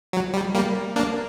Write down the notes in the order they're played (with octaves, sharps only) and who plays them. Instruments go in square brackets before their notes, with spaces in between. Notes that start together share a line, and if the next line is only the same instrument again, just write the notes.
[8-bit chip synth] F#3
G3
G3 A#3
A#3 D4